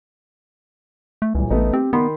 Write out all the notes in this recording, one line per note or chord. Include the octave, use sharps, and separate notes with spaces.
A3
D#1 C#2 E3
A1 A3 B3 D#4
C4 G4
D#3 B3 B5 C6